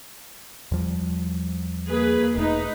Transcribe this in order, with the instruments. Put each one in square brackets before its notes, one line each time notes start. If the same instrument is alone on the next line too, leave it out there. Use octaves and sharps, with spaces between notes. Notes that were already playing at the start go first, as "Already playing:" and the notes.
[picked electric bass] E2 F3 G3
[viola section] A#3 G#4 B4
[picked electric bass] E1 A3 [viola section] D#4 B4